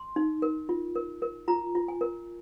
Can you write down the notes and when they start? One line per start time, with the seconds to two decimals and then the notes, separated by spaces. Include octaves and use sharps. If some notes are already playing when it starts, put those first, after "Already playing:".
Already playing: C6
0.16 D#4
0.42 A#4
0.69 F4
0.95 A#4
1.22 A#4
1.48 F4 A#5
1.75 F4
1.88 G#5
2.01 A#4